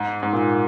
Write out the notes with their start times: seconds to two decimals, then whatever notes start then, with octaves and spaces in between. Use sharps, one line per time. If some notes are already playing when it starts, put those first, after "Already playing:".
Already playing: G#2
0.23 G#2
0.33 A#2